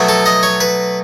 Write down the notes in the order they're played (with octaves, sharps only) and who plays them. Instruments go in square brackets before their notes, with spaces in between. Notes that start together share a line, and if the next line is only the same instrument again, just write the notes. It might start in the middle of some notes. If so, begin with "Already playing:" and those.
Already playing: [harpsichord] B2 F#3 A3
A4
D#5
C#5
B4